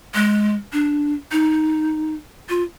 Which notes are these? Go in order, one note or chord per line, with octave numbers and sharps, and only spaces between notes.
G#3
D4
D#4
F4